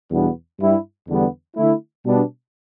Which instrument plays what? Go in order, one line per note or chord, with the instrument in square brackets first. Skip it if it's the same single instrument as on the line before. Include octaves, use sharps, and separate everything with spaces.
[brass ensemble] E2 B2 G3 B3 D4
G2 G3 E4
E2 D3 G3 B3 D4
D3 A3 E4
B2 G3 B3 D4